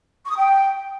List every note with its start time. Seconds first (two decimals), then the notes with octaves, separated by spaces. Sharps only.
0.24 C#6
0.30 D#6
0.36 G5